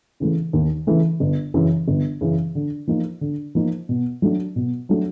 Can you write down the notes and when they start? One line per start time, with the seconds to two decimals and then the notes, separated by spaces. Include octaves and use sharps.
0.20 C#3 E3 A3
0.53 D#2
0.87 C#3 E3 A3
1.20 G1
1.54 F#2 C#3 E3
1.88 G1
2.21 F#2 C#3 E3
2.55 D3
2.87 F3 A#3 D#4
3.21 D3
3.55 F3 A#3 D#4
3.89 B2
4.22 F#3 A3 D4
4.56 B2
4.89 F#3 A3 D4